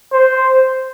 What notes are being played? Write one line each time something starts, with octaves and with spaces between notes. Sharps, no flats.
C5